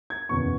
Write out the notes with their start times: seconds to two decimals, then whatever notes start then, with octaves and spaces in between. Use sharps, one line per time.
0.10 G#6
0.29 F#1 E2 B2 C#6